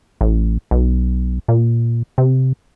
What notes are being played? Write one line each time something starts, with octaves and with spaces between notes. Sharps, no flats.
A1
B1
A#2
C3